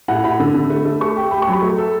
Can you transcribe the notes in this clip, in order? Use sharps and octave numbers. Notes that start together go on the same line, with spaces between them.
A2 F#5
A2 B5
D3
D3
A3
A3
A3 C#6
G4
G4 B5
C#6
F#3 B5
A3
A4